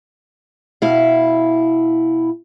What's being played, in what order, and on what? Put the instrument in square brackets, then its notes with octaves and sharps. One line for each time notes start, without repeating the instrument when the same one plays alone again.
[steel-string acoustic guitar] B2 E4 F5